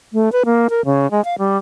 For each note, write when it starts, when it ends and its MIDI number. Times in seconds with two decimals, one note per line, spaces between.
0.13 0.32 57
0.32 0.43 71
0.45 0.67 58
0.70 0.85 70
0.85 1.09 49
1.11 1.24 56
1.25 1.35 77
1.39 1.58 55